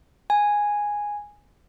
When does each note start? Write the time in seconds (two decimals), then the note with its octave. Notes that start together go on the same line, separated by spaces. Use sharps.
0.30 G#5